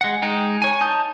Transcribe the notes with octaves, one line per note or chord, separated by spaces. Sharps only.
G#3 F#5
G#3 D#4 G5
C#5 G#5
D#4 A5 D#6 G6